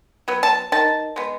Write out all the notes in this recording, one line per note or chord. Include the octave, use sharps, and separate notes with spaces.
F#3 B3
A5
D#3 A5
G#3 B3